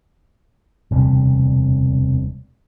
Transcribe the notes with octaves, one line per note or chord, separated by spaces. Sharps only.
E1 D2 C3 G3